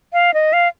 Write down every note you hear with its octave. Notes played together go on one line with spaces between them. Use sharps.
F5
D#5
F5